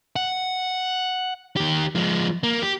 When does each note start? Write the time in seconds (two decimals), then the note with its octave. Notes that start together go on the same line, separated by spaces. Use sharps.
0.16 F#5
1.56 D#3 G4
1.95 F3 G#3
2.43 A#3
2.62 G4